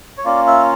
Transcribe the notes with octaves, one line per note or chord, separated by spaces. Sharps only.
C#5
A#3 C#4 F4 D5
E5